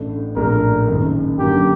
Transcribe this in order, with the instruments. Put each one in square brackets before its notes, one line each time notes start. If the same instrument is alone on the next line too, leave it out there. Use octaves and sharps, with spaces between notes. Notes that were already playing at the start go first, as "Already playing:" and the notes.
Already playing: [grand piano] A1 A2 A3 D4
[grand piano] A#1 A2 A3 D4 [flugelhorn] A#4
[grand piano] F#1 F#2 D#3
[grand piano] F#2 D3 F#3 A#3 [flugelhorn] G4